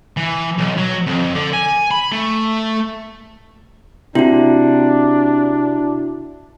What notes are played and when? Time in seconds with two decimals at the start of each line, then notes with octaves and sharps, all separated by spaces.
0.17 E3
0.58 B1
0.78 F#3
1.07 F2
1.35 D3
1.54 G#5
1.91 B5
2.12 A3
4.15 C3 D4 E4 F#4